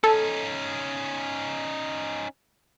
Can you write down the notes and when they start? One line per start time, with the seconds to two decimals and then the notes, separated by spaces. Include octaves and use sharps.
0.04 C#4 D#4 A4